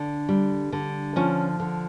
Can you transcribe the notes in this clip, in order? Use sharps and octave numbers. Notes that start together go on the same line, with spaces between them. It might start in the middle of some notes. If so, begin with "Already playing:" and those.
Already playing: D3 D4
G3
D3
F3 C#4
D3